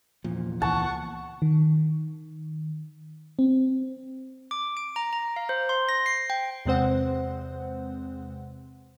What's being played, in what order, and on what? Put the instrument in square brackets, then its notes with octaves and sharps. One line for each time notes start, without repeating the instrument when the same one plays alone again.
[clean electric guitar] E2 A#2 [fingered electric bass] F3
[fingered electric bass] C#2 E3 [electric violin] F#5 C#6 [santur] A5
[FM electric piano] D#3
C4
[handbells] D6
D7
A#5
A#5
F5
C5
C6
A#6
C7
G5
[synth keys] E2 C3 G#3 C4 C5 F#5